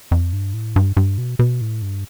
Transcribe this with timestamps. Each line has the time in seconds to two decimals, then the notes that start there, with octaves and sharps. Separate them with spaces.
0.11 F2
0.33 G2
0.54 A2
0.76 G2
0.97 G2
1.18 B2
1.39 B2
1.61 A2
1.82 G2